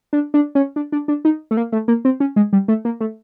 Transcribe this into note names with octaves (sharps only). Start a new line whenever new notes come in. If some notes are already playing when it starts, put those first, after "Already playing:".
D4
D4
C#4
D4
D4
D4
D#4
A3
A#3
A3
A#3
C4
C#4
G#3
G3
A3
A#3
A3